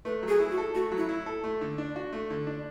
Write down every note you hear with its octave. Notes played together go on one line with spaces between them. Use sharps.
A3 B4
F#3
G#4
E4
F#4
A4
A3 F#4
F#3
E4
E4
A4
A3
D3
D4
F#4
A3
D3
D4